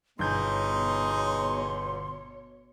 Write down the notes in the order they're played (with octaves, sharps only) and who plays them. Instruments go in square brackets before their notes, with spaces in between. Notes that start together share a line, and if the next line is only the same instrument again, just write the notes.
[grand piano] G1 G6 [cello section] B2 C#5 [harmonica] D#4 G#4 [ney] C6